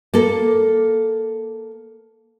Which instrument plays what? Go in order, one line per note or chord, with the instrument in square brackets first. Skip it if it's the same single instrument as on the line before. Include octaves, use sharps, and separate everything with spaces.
[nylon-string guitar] A#3 A4